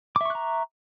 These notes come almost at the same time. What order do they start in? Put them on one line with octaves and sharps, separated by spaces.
D6 E5 C#6 F#6 A#5